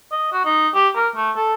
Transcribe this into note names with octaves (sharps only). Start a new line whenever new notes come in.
D#5
F#4
D#4
G4
A#4
A3
A4